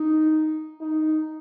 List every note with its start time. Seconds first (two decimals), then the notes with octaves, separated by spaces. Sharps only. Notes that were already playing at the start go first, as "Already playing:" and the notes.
Already playing: D#4
0.81 D#4